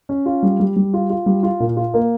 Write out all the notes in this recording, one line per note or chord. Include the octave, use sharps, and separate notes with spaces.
C#4
F4
G3
G3
G3
F4
F4
G3
F4
A#2
F4
A#3